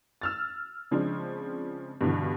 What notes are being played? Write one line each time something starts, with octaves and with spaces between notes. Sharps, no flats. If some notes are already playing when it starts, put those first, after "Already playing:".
E6 F6 A6
C#3 F3 G#3 C4 D4
G2 B2 D3 E3